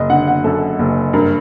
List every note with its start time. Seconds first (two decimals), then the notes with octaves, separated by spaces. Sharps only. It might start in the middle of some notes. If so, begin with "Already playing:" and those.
Already playing: F#1 D#5
0.10 D3 F#5
0.27 F#5
0.44 F#2 A4
0.79 F#1
1.13 G2 A#4